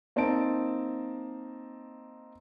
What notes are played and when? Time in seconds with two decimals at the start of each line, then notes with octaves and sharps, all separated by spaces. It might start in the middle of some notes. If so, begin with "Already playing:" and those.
0.16 A#3 C4 D#4 A5 D7